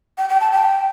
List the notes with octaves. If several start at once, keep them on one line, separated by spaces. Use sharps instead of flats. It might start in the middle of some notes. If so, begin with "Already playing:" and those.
G5
G5
A5
G5